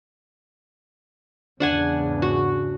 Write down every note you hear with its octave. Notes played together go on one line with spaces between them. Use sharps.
E2 G#2 C#3 D4 F#5 G#5
F#4